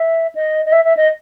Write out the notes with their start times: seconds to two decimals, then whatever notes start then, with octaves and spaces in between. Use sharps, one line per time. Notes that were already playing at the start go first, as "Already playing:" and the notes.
Already playing: E5
0.35 D#5
0.66 D#5
0.72 E5
0.85 E5
0.97 D#5